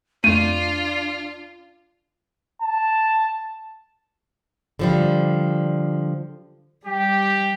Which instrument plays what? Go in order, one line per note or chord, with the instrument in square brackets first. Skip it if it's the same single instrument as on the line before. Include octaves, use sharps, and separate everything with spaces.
[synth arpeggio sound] F2 A3 [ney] D4 [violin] F4 [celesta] D#7
[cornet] A5
[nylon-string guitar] D3 F3 G3
[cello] G3 [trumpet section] G4